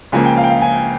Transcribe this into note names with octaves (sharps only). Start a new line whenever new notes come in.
C#2 C#3 F3 A#3 G#5
G5
F5
G5
F5
G#5